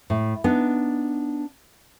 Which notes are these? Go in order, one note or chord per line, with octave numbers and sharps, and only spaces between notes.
A2
B3 D4 D#4